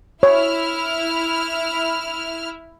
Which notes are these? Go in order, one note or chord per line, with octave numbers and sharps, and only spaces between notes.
E4 C#5 F6